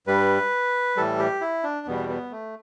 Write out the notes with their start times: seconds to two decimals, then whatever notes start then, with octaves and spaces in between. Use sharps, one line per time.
0.07 G2 G3 B4
0.96 A2 E3 G3 A4
1.19 G4
1.41 E4
1.64 D4
1.87 E2 B2 G3 B3
2.09 B3
2.31 A3